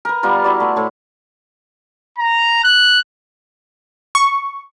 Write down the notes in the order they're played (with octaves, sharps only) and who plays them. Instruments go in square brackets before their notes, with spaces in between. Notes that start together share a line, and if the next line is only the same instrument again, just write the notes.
[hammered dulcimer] A#4 B4
G3 B3 F4 A#4
E4 F#4 D5
A3 C6
A2 A4
[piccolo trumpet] A#5
F#6
[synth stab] C#6